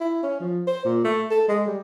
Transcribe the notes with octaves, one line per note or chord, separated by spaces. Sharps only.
E4
C#4
F3
C5
A#2
A3
A4
G#3
G3